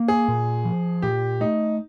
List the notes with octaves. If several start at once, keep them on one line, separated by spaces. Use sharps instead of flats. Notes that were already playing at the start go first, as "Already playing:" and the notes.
Already playing: A#3
G#4
A#2
F3
A#2 G4
A3 D#4